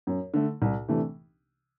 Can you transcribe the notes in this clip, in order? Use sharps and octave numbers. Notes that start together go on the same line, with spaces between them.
F#2
D3 A3
C2
C3 E3 A3 D4